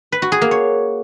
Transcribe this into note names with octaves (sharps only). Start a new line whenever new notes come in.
B4
F#4
G#4
A#3
C#5